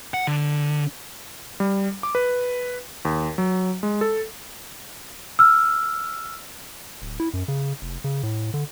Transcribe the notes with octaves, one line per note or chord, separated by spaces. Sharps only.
F#5
D3
G3
D6
B4
D#2
F#3
G#3
A4
E6 F6
D1
E4
F#2
C#3
F1
C#3
A2
D3